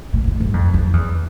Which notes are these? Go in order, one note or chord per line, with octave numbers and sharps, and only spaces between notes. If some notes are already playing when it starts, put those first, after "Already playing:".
A2
A2
G2
F2
F2
E2